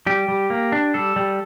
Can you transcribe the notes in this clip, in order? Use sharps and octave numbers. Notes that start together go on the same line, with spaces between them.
G3 G4
G3
A#3
D4
G3 A4
G3